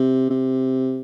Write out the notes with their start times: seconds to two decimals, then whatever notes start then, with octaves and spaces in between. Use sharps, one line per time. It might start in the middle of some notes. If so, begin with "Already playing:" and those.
Already playing: C3
0.30 C3